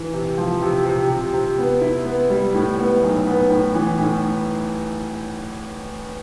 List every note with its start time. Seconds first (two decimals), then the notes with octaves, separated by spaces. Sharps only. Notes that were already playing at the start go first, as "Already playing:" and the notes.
Already playing: E3
0.13 C3
0.38 F3
0.62 C3
0.85 C3
1.09 C3
1.34 C3
1.58 B3
1.81 E4
2.05 B3
2.30 G3
2.54 A2
2.78 B3
3.03 B1
3.27 B3
3.50 A2
3.74 E3
3.98 A2